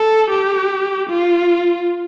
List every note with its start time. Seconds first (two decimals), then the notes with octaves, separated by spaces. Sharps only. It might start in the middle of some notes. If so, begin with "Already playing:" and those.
Already playing: A4
0.30 G4
1.10 F4